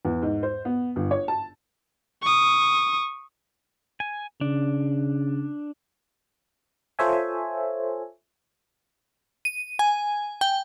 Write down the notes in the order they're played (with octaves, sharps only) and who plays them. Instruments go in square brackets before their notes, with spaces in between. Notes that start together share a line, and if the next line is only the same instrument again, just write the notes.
[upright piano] E2
G#2
C5
B3
G1
C#5
A5
[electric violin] C#6 D#6
[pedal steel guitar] G#5
[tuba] C#3 [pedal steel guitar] D4
[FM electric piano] F4 A4 C5 C#5 E5 G#5
[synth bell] D#7
G#5
G5